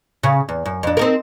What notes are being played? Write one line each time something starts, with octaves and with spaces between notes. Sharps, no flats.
C#3
E2
F#2
F2 D4
C4 D#4 A#4